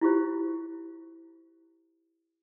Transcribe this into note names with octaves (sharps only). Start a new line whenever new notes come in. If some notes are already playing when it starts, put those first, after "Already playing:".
E4 F4 G4 C5